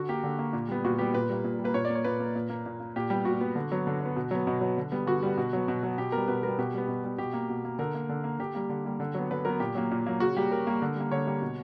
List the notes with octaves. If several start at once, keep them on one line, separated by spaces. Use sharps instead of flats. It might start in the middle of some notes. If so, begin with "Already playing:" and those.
Already playing: D3 F#4
A#3 G4
D3
A#3
A#2
G3 B3
A#2 F#4
G3 B3 G4
A#2 B4
G3 A#3
A#2
G3
A#3 B4
A#2 C#5
D5
A#3
C#5
A#2 B4
A#3
A#2
A#3
A#2
A#3
A#2 G4
G3 B3 G4
A#2 F#4
G3 B3
D3
F#3 B3
D3
F#3 B3
B2
F#3 B3
B2
F#3 B3
D3
G3 B3
D3 F#4
G3 B3
B2
F#3 B3
B2
F#3 B3
B2 G4
G3 B3 A#4
B2 B4
G3 B3 A#4
B2 G4
G3 B3
B2
G3 B3
B2 G4
A#3
B2
A#3
D3 A#4
A#3
D3
A#3
D3 G4
G3 A#3
D3
G3 A#3
D3
F#3 B3
D3 B4
F#3 B3 A#4
A#2 G4
F#3 A#3
A#2
F#3 A#3
C#3 F#4
G3 A#3 G4
C#3 A#4
G3 A#3
D3
G3 A#3
D3 C#5
G3 A#3
B2